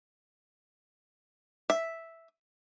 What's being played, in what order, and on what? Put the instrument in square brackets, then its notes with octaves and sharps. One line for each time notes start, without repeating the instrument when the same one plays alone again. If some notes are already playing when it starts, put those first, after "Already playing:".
[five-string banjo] E5